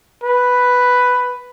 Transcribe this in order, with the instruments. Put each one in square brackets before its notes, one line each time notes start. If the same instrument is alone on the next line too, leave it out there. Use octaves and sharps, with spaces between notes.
[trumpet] B4